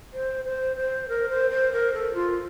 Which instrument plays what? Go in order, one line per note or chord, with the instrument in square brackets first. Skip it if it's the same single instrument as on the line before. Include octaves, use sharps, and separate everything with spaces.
[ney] C5
C5
C5
A#4
C5
C5
A#4
A4
F4